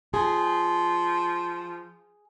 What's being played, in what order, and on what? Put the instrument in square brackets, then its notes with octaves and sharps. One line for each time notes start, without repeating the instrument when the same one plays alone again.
[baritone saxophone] F3 [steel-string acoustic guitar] G#4